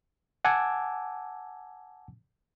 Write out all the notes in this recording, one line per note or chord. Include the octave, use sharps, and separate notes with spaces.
F#5 G#5 A5 D6 E6 G#6